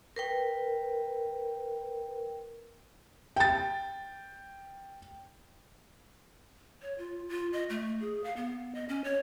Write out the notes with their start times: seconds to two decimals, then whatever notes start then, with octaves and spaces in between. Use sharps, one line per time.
0.16 A#4 B4 G5
3.36 G5 A6
6.82 C#5
6.98 F4
7.29 F4
7.53 D#5
7.70 A3
8.00 G#4
8.24 F5
8.36 B3
8.75 D#5
8.89 C#4
9.04 C#5